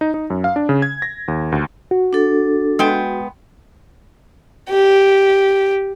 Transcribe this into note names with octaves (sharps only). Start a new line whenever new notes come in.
D#4
D#4
F#2
F5
D4
C#3
G#6
A#6
D#2
D2
F#4
D4 A4
G#3 B3 G5
G4